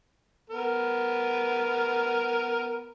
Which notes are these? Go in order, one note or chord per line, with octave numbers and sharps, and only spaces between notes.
B3 A#4